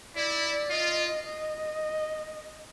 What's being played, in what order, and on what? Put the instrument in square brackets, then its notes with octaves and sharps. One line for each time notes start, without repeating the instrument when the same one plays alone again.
[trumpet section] E4 [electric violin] D5
[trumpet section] F4 [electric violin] D#5
[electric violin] D#5